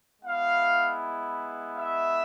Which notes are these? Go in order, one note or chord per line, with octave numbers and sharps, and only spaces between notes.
G#3 B3 E4 F5
E5